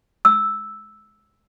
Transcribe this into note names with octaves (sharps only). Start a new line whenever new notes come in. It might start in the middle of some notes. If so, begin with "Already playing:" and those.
E6